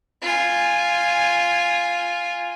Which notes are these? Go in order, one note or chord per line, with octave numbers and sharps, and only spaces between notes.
F4 G#5